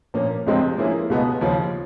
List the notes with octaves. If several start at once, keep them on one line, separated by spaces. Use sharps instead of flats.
A#2 F3 A#3 C#4
C#2 C3 F3 G#3 C4
F3 A#3 C#4 E4 G#4
C#2 B2 G#3 B3
D#2 C#3 F3